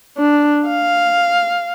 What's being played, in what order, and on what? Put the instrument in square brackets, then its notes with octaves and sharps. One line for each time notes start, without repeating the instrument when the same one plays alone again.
[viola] D4
F5